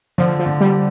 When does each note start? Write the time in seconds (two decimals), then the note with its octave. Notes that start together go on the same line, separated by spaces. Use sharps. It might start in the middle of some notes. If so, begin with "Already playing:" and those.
0.18 D3 F3
0.39 F3
0.46 D3
0.60 G3